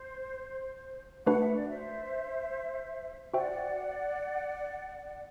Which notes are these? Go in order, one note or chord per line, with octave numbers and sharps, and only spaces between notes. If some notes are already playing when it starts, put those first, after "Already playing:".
Already playing: C5
A3 D4 F#4 B4 F#5
E5
D5
C5 E5
F#4 C5 D5 E5 F#5 G5